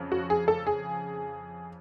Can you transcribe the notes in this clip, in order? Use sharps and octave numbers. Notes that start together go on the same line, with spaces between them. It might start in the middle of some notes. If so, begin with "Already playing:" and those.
Already playing: F2 C#3
F#4
G#4
A4
G#4